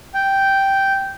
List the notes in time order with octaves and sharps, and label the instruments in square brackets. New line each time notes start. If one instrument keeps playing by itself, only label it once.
[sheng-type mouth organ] G5